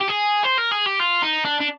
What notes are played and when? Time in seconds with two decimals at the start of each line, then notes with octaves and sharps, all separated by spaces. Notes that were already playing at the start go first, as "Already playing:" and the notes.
0.01 G4
0.09 G#4
0.44 C5
0.58 A#4
0.72 G#4
0.86 G4
0.99 F4
1.22 D#4
1.45 D4
1.61 D4